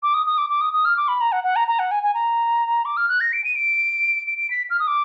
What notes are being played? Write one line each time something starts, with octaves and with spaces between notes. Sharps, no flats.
D6
D#6
D#6
D6
D6
D#6
D#6
F6
D6
B5
A#5
F#5
F#5
A#5
A#5
F#5
G#5
G#5
A#5
D6
F6
F#6
A#6
D7
D#7
D7
D7
D7
B6
F6
D#6
D6